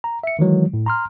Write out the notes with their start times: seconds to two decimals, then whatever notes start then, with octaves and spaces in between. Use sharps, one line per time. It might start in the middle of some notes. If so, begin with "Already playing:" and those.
0.04 A#5
0.24 E5 C#7
0.39 D#3 E3 F#3 G#3
0.74 A2
0.86 A#5 C6 F6